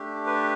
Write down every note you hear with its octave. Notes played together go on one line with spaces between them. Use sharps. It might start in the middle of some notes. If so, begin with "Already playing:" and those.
Already playing: A3 D4 G4
B4